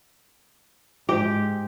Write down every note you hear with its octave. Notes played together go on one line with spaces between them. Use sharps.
G#2 G4